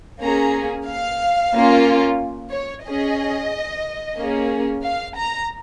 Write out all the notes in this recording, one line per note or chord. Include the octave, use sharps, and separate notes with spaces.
A#3 C#4 G#4 A#5
F5
A#3 C#4 F4
C#5
C#4 G#4 D#5
A#3 C#4 G#4
F5
A#5